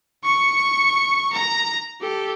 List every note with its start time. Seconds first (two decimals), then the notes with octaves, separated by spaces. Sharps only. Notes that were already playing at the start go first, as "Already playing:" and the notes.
0.24 C#6 C#7
1.32 A#5
2.01 G4 A4